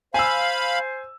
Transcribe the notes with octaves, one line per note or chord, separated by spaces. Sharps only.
C5 F5 G#5 B5 E6